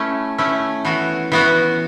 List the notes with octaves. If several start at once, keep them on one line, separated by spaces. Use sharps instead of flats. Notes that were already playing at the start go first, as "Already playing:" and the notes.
Already playing: A3 C#4 E4
A3 C#4 E4
E3 B3 F#4
E3 B3 F#4